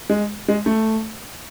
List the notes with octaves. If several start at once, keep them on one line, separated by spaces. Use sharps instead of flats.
G#3
G#3
A3